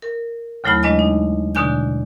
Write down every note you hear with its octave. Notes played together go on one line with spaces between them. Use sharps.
A#4
D#2 C#3 F#3 A3 E4 B5
G#3 D4 D#5 G#5
D#4
B2 D3 D4 G#5 G6